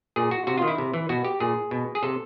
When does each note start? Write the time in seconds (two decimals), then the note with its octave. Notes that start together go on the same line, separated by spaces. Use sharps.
0.16 A#2 G#4
0.31 F#4
0.47 C3 F#4
0.58 F4
0.62 D#3
0.68 E4
0.78 C3
0.94 E3
1.09 B2 F#4
1.25 G4
1.40 A#2 G#4
1.71 B2
1.95 G#4
2.03 C3 A4